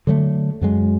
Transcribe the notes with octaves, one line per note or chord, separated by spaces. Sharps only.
D3 F#3 G#3 A3
F#2 F#3 G#3